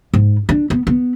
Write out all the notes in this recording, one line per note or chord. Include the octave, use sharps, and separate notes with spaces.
G#2
D4
B3
B3